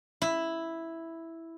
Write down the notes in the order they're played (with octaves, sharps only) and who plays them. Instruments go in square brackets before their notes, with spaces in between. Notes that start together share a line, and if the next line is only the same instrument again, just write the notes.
[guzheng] E4